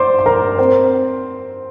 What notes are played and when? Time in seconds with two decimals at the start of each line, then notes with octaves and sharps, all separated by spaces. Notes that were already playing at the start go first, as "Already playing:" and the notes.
Already playing: C5 D5 C6 D6
0.19 C6
0.26 A#4 A#5
0.58 C4 C5